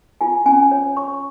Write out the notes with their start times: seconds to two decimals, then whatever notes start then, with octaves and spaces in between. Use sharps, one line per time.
0.21 F4 G#5
0.46 C#4 G#5
0.71 C#5
0.97 C#5 C#6